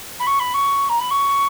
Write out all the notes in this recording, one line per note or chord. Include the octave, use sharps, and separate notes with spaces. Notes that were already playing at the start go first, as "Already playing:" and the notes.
B5
C#6
B5
C#6
A#5
B5
C#6